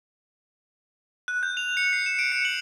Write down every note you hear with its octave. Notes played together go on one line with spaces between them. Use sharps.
F#6
G6
F7
C#7
C7
E7
D7
C#7
F#7